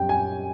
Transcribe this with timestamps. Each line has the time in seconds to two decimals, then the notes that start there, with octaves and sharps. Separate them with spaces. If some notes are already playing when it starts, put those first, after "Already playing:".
Already playing: F#2 G3 G5
0.09 G#5